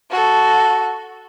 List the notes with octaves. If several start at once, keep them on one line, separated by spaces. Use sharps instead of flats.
F#4 A4